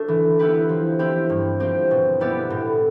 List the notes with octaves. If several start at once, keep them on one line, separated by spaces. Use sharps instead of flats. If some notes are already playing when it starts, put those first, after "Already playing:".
Already playing: A3 D4
E3
B3 E4 G4 B4
F3
C4 E4 G4
G2
F3 C4 G4
B2
B3 E4 G4 D5
A2